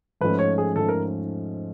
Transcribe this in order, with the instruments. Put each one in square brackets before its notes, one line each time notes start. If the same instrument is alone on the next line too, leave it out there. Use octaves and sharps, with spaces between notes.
[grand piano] G#2 F3 A3 C#4 [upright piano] B4
[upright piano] C#5
G#4
[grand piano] G#2 F3 A3 C#4 [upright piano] A4
[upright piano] A#4